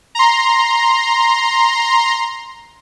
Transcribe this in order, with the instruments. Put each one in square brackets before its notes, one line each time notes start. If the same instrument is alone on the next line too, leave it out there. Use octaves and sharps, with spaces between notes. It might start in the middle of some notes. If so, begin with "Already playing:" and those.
[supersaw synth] A#5 C6